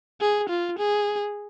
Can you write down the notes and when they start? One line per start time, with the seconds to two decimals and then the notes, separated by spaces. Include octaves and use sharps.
0.21 G#4
0.49 F4
0.78 G#4